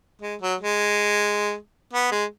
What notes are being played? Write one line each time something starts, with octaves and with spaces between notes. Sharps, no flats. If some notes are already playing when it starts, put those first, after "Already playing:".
G#3
F#3
G#3
B3
G#3